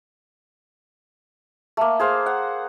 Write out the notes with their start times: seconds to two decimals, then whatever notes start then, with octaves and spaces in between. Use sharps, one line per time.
1.77 A3 A#3
2.00 G#4 C5 F5
2.26 F#5